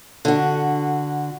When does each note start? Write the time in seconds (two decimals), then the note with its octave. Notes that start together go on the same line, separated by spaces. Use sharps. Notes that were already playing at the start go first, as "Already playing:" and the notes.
0.25 D3 F#4